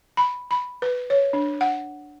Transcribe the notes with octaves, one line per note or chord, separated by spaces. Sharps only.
B5
B5
B4
C#5
D4
F#5